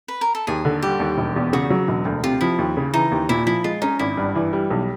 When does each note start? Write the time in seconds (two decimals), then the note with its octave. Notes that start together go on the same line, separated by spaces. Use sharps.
0.08 B4
0.21 A#4
0.35 A4
0.47 D#2 G#4
0.65 D3
0.83 G3 G4
1.00 D#2
1.18 E1
1.36 E2
1.53 C#3 F#4
1.70 F#3
1.88 E1
2.05 D2
2.24 C3 F4
2.41 F3 E4
2.59 D#2
2.77 C#3
2.94 E3 D#4
3.12 D#2
3.29 A#2 E4
3.46 F3 E4
3.64 G#3 F4
3.82 C#4 D#4
3.99 G#1 E4
4.17 G2
4.35 E3
4.53 G3
4.71 B1